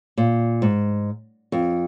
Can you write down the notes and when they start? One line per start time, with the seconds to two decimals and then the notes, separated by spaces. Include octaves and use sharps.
0.17 A#2
0.62 G#2
1.52 F2